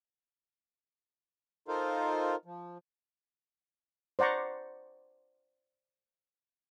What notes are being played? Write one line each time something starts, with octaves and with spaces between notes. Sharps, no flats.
D#4 F4 A4 A#4 C5 F5
F3
C5 D5 F#5 A#5 C#6